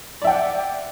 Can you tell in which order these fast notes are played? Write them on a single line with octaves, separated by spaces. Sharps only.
D5 E5 G5 F#5